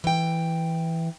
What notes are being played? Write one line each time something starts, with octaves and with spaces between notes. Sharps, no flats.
E3 G5